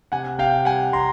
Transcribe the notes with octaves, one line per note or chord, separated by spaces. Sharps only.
C3 F#5 G#5
C3 F5 G5
G3 F#5 G#5
C3 A#5 C6